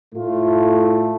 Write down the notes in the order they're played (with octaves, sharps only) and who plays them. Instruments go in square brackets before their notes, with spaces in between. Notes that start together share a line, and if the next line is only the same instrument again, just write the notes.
[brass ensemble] A2 A3 F4